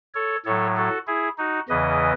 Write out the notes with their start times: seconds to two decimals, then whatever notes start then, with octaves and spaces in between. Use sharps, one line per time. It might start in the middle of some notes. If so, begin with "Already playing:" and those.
0.14 A4 C#5
0.45 A2 F#3 A4 C#5
0.77 F#4 A4
1.07 E4 G#4
1.38 D#4 F#4
1.69 E2 C#3 E3 B4 D#5